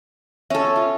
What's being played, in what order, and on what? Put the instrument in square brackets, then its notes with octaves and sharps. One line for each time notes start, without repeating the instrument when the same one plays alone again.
[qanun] C#4 A4 [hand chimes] E5
[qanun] F4